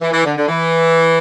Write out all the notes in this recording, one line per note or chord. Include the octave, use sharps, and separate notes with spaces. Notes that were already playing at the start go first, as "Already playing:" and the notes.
E3
E3
D3
D3
E3